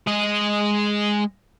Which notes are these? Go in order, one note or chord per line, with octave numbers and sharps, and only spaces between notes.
G#3 D#5